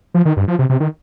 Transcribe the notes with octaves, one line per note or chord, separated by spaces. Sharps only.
F3
D#3
G2
F3
C3
C3
D#3